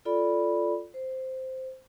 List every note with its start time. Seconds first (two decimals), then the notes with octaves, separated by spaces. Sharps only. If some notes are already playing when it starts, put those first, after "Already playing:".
0.05 F4 A4 D5 B5
0.94 C5